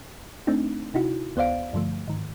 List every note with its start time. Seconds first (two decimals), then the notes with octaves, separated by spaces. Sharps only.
0.47 A3 C4 D4 D#4
0.94 C3 D#4 E4 F#4
1.36 D2 B3 C5 D5 F5 D7
1.73 G2 D3 F3 A3
2.08 G#2 D#3